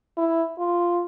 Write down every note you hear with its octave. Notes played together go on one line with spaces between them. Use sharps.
E4
F4